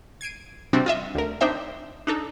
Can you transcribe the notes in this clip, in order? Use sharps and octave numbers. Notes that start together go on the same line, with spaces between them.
G#6 C7 D7 D#7
C3 G3 C4 D4 F#4
F4 D#5 E5
D2 A#4
C4 D4 D#4 C5 E5 G5
D4 D#4 A4